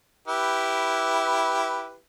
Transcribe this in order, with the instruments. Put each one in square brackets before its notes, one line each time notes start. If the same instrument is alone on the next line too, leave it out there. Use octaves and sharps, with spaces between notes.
[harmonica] E4 G4 B4